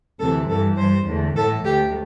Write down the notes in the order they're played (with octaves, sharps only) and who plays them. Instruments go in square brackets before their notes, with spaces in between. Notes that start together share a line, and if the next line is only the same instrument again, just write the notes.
[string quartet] D2 C3 E3 A4
G2 E3 G3 A4
G2 G3 C5
E2 D3 A3
A2 E3 A3 A4
D2 D3 A3 G4